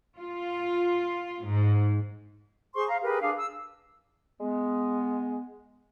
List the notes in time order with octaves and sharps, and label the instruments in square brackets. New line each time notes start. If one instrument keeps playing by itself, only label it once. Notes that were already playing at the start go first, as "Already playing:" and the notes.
[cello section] F4
G#2
[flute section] G#4 C5 C6 C#6
F5 A#5
G4 G#4 A#4 B4
D4 G#4 F5
E6
[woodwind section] G#3 B3